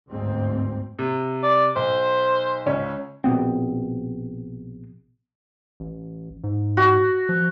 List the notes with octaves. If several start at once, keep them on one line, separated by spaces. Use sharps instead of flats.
G1 D2 G#2 C4
C3
D5
B1 C5
C#2 C#4
A#1 B2 B3 C4
A1
G#2
F#4
F3